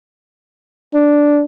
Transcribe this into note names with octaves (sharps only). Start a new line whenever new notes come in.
D4